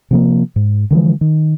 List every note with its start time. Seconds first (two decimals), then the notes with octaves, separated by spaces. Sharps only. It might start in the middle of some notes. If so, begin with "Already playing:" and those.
0.11 C3 F3 A#3
0.56 G#2
0.91 D3 E3 F3 G#3
1.21 D#3